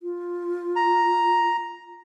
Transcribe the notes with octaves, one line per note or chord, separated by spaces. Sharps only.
F4
A#5